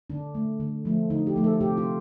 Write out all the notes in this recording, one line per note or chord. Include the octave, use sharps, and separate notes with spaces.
D3 D4
A3
D3
F3 A3
D3 D#4
G4
F3 A3
A4
C3 G4
F4